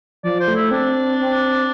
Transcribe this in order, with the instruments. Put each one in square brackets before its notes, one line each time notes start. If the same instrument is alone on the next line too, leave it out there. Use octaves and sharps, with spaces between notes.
[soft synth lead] F3 [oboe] D5
[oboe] C5
[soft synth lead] A3
[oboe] E4
[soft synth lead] C4 [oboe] D4
[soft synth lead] C4